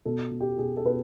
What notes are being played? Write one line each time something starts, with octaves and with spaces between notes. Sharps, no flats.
B2 A4
B2
G4
B2 G#4
A4
B2 B4